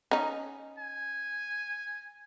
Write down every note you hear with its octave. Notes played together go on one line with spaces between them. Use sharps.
C#4 D#4
G#5